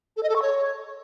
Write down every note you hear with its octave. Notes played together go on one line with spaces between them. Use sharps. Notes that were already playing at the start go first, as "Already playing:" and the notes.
A4
D#5
A4
C#6
C#5